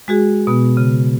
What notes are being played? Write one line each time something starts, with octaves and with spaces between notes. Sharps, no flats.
G#3 F#4 G#4
B2 B3
C#3